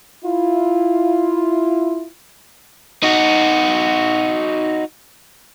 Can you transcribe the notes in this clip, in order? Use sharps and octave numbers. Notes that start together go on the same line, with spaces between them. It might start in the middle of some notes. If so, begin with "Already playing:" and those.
E4 F4
D#4 F#4